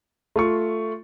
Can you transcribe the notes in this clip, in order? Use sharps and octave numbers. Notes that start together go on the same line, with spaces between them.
A3 F4 C#6